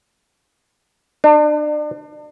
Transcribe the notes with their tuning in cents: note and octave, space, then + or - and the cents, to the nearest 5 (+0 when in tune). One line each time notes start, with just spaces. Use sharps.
D4 +35